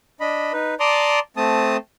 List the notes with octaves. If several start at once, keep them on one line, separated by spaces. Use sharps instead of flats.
D4 D#5 B5
D#4 B4
D5 A5 A#5 C6 D6 D#6
A3 C4 A5 D#6